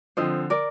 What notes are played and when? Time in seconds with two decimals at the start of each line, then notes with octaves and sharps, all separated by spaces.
0.17 D3 F3 C4 C5 D#5
0.50 A#4 D5